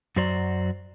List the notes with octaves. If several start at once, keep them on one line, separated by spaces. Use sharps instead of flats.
F#2 F#3 F#4 C5 D5 A#5